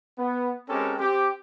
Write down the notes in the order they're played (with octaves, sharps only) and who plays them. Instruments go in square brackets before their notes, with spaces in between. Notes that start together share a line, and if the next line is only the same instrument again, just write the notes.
[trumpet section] B3
G#3 C4 C#4 G4 A4 A#4
C4 G4